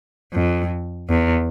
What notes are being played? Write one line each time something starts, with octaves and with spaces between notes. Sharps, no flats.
F2
E2